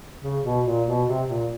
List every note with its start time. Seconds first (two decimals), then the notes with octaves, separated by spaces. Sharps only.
0.22 C#3
0.44 B2
0.65 A#2
0.87 B2
1.07 C3
1.29 A#2